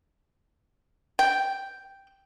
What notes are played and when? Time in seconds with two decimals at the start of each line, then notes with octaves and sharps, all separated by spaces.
1.19 G5